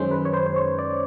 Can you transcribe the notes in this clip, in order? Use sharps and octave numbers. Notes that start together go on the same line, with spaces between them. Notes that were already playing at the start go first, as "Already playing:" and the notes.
Already playing: F#2 D#3 G#3 C#4 C5
B4
C#5
C5
C5
C#5
D5